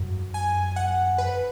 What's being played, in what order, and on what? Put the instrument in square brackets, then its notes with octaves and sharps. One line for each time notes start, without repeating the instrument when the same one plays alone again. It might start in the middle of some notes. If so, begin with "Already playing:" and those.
Already playing: [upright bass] F#2
[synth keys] G#5
F#5
B4